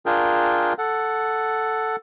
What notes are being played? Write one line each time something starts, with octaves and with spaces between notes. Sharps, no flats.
D4 F4 G#4 A#4 G5
A4 F#5